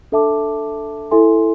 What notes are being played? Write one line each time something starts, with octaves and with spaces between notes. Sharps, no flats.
D4 A4 E5 A5 D6
E4 A4 E5 G#5 C6